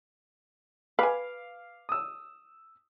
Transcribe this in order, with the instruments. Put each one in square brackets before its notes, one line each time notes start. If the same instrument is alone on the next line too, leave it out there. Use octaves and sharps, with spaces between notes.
[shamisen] B4 G#5 [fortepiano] F5 D6
[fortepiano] D#6 E6